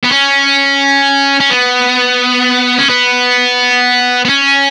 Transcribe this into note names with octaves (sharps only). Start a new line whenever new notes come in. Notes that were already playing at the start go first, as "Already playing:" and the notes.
B3
C#4
C#4
B3
C#4
B3
B3
C#4